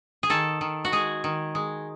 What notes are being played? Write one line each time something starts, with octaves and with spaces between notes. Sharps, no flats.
G#4
D#3 A4
D#3
F#4
G#3 G#4
D#3
G#3